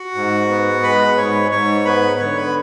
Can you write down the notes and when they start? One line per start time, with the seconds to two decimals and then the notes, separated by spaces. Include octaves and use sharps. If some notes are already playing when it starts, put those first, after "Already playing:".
Already playing: F#4 F#5
0.14 G#2
0.49 B3
0.83 G#3 B4 B5
1.17 G#2 C#5 C#6
1.51 G#2 C#5 C#6
1.85 B3 B4 B5
2.20 D3 C#5 C#6
2.37 B4 B5